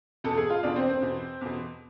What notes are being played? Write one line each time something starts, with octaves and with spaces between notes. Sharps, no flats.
E2 B2 A4
G#4
F4
E2 B2 D4
C4
C4
E2 B2
E2 B2